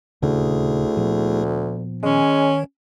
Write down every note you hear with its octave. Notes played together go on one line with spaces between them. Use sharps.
D#1 D2 C#3 A3 D4 E4 G#4
A#2 F3 B3
D#3 G#3 C#4 C#5